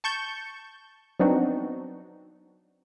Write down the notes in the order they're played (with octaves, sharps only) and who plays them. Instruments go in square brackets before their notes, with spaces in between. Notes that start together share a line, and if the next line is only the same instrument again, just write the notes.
[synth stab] A5 C#6 G6
F#3 B3 C4 D4 D#4 F#4